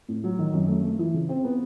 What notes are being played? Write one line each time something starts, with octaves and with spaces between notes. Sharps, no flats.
A2
F#3
D#3
F#2
A3
A3
E3
C#3
C4
B3